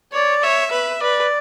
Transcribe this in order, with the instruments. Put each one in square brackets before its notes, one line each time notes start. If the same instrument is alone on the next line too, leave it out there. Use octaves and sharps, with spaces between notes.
[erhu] C#5 [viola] D5
[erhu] C#5 [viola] E5
[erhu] B4 [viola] E5
[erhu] B4 [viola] D5